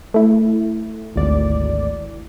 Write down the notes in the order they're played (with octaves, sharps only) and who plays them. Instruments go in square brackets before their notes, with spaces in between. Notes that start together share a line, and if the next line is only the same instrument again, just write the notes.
[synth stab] A3 E4
[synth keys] G#1 D2 D5